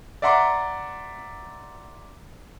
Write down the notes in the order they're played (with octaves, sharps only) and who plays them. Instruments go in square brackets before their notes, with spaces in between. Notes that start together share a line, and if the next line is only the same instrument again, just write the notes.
[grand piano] D5 E5 F#5 A#5 C6 D6